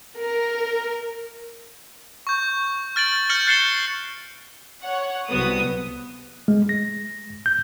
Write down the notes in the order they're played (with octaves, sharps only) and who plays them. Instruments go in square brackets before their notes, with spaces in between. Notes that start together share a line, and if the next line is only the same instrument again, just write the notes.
[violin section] A#4
[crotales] C#6 G6
F6 A6 D7 F#7
F6 G6 A#6 C#7 F#7
F#6 A6 C7 C#7 E7 G7
[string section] C#5 F#5
C2 F#3 B3 D#6
[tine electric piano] G#3
A#6
G6